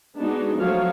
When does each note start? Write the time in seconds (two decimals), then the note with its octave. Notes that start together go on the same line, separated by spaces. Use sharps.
0.18 G#3 B3 D4 D#4 F#4 G#4
0.56 F3 F#3 A3 F#4 C#5 F5